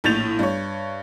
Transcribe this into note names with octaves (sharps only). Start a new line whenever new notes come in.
A#1 A2 G6 A6 F7
G2 C#5